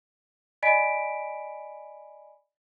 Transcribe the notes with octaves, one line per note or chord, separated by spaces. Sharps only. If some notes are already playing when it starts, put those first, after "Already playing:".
D5 D#5 G#5 B5 B6 D7